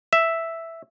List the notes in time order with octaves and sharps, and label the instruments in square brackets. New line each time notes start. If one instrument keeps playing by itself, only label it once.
[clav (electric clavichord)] E5